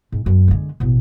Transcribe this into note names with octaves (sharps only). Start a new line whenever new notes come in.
G#2
F#2
D3 G#3
A1 B2